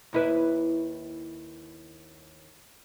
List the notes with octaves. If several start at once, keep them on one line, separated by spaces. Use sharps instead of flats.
D#2 E4 B4